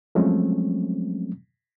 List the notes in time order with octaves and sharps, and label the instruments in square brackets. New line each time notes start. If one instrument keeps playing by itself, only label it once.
[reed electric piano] F3 F#3 G#3 A3 C4 C#4